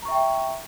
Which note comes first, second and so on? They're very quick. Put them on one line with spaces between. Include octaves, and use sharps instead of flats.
A#5 C#6 E5 G5